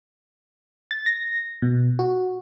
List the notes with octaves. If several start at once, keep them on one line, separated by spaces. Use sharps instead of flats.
A6
A#6
B2
F#4